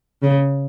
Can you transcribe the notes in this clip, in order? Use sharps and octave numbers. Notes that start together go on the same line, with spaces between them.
C#3